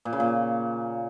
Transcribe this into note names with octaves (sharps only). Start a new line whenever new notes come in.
A#2
C#3
A#2